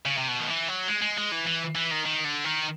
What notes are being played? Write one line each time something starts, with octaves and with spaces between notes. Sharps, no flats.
C#3
C3
B2
D#3
E3
F#3
G#3
G#3
G#3
E3
E3
E3
D#3
D#3
D3
D#3